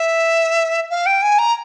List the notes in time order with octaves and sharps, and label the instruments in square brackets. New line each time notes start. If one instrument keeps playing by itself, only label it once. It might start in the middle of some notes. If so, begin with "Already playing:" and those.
Already playing: [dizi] E5
F5
G5
G#5
A#5